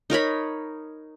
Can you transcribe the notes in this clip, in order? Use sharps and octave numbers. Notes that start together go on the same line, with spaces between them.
D#4 A#4 C#5 B5